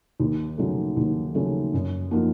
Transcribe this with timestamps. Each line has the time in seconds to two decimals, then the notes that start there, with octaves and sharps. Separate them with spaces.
0.20 D#2
0.58 C#3 F#3 A3
0.97 D#2
1.35 C#3 F#3 A3
1.74 F#2
2.11 F3 A#3 D#4 F#4